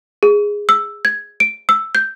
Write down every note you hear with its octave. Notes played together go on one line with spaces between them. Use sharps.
G#4
E6
G#6
D7
E6
G6